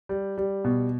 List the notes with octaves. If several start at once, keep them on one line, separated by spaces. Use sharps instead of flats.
G3
G3
B2